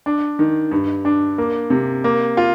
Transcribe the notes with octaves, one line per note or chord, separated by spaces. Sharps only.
D4
D#3
G2
D4
A#3
C3
A#3
F4